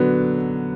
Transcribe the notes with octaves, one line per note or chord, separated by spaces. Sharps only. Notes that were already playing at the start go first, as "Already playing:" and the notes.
Already playing: D3 F#3 B3